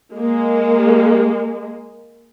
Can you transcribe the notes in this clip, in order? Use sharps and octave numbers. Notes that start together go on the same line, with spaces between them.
G#3 A#3